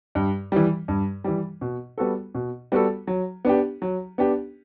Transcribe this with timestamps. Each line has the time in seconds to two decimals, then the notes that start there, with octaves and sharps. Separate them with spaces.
0.15 G2
0.52 E3 G3
0.88 G2
1.24 E3 G3
1.61 B2
1.98 G3 B3 F#4 A4
2.35 B2
2.72 G3 B3 F#4 A4
3.07 F#3
3.45 B3 D4 G4
3.82 F#3
4.18 B3 D4 G4